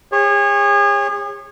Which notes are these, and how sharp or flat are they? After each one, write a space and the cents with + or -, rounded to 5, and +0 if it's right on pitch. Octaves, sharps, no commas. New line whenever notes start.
G#4 -40 C#5 -20